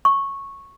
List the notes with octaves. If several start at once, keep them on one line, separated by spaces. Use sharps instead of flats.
C#6